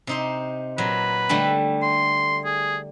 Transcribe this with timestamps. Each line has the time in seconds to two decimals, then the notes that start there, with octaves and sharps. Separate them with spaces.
0.07 C3 D#4 C5
0.78 A#2 F#3 B4
1.29 D3 G3 A3
1.82 C6
2.45 G#4